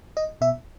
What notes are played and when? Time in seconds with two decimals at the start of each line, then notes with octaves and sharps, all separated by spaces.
0.17 D#5
0.41 B2 E5